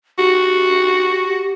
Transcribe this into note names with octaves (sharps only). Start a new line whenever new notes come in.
F#4 G4